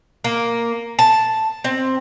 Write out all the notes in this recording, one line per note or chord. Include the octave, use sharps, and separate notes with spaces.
A#3
A5
C4